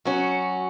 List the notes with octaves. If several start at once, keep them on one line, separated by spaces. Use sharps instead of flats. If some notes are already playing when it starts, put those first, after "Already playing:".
F#3 C#4 F#4